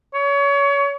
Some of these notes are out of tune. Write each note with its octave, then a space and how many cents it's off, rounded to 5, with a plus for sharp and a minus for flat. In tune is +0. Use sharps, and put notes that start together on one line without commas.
C#5 +25